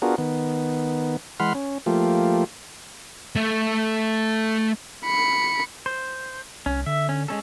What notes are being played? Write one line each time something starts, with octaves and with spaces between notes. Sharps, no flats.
B3 D4 F4 F#4 G#4 A#4
D#3 B3
E3 G#3 F#5 B5 C6 F6
C#4
F3 A3 A#3 F4 G4
A3 E5
B5 C#7
C5
C2 C#4
D3 E5
C#4
G#3 C#4 A4